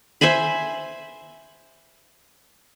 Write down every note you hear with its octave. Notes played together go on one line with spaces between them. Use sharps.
C5 E5 G#5 B5